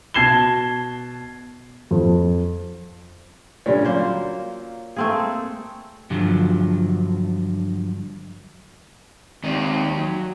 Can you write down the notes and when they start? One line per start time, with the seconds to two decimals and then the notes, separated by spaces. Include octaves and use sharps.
0.14 B2 A5 G#6 C7 E7 G7
1.91 F2
3.66 A#2 D3 G3 C#4
3.84 F#3 A#3 F4 C5
4.96 A3 A#3 C4 G#4
6.10 G2 D3 F3 F#3
9.44 D#3 G#3 C4 G4 D5
9.97 F#3